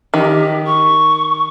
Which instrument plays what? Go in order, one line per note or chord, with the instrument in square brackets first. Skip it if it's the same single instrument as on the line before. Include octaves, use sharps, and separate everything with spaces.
[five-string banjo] D#3 [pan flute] G4
[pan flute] C#6